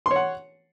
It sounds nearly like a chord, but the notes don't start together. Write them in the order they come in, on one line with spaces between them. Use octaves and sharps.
C6 C#5 F#5